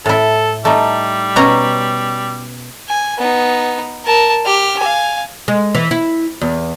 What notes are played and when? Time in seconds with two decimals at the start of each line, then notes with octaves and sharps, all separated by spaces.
0.06 A2 E4 A4
0.65 G3 A3 D#4
1.36 B2 C#4 A#5
2.89 G#5
3.18 B3 D#4
4.05 A#4 A5
4.45 G4 F6
4.79 F5 G#5
5.48 G#3
5.75 E3
5.91 E4
6.41 E2